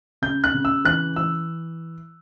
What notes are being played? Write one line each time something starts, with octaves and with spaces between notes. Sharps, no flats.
C#3 G6
F#6
C#3
E6
E3 F#6
E3 E6